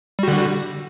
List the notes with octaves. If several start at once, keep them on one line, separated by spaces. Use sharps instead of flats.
D3 G3 F#4